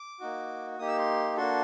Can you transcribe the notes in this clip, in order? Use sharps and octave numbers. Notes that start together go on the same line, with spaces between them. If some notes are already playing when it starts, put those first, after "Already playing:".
Already playing: D6
A#3 D#4 F#4
A#3 D#4 G4 D#6
E6
C6
A#3 D4 F#4 A4 C6